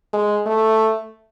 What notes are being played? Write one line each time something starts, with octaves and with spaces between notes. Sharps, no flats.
G#3
A3